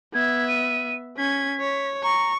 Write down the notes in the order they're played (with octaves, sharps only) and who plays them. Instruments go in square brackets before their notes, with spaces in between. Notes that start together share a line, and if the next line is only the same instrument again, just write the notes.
[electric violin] B3 E5 [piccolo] G#6
[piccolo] D#7
[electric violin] C#4 G#6 [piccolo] B6
[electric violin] C#5
[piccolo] A#5 [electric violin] C#6